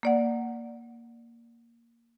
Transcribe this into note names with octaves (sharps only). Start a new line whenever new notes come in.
A#3 D5 F#5